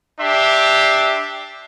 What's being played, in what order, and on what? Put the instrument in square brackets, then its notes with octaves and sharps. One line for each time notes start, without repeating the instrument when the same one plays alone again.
[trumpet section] D4 G4 E5 C6